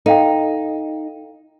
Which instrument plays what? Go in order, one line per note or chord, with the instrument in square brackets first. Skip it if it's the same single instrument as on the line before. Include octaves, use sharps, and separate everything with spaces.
[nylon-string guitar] D#4 [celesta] A4 F5 G5